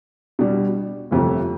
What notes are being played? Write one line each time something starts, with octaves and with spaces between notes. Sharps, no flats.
B2 G3 D4
G1 F2 C3 F3 A3